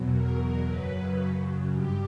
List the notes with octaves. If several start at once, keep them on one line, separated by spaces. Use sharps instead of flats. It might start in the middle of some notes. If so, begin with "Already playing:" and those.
Already playing: E2 B2 F#3
A#4
F#2 C#3 F#3 B4
G2 G4